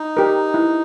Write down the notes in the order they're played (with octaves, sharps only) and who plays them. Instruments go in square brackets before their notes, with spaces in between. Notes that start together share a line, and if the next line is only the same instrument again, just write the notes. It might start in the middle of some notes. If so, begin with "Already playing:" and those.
Already playing: [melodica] D#4
[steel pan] G4 A#4
E4